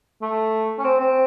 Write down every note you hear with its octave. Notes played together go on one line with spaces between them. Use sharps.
A3
C#4
C4
C4